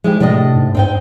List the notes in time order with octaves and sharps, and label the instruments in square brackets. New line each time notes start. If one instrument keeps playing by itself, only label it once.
[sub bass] F3 [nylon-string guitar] G#3 E4 G4
[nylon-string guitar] A2 D4 D#5 [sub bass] C3
[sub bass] G#2
[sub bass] G2 [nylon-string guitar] C4 D#4 G5